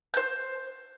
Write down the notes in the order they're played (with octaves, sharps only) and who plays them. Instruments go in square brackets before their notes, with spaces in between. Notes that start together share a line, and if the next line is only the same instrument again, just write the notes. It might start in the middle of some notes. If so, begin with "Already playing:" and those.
[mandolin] C5 G6